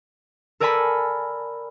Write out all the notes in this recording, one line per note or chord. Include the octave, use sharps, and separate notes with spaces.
A4 A#4 D5 G#5 A5 B5